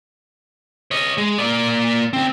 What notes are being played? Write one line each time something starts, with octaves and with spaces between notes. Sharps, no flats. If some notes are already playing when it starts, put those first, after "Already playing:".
C#5 D#5
G#3
A#3 D5
D2 C4